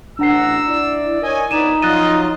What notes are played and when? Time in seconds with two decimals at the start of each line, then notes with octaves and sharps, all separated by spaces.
0.19 A1 D4 F#5 A#5 E6 C7
0.67 E4 D5
1.23 A#4 C#5 D#5 G#5
1.51 G1 B3 D#4 B4 D5 D#7 E7
1.82 F3 F#3 F4 D#5 F#6 A6 D#7